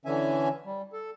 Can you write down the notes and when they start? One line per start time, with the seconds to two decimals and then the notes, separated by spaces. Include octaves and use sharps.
0.05 D3 E3 C#4 E5 G#5
0.65 G3
0.93 A4